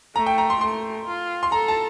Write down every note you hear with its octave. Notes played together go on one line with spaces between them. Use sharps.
A3 A#5
G5
A#5
C6
A3 C6
F4
C6
A4 A#5
A5